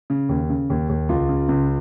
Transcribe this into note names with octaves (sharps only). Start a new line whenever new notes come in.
C#3
D#2
C#3
D#2
D#2
C#2 F4
C#3
C#2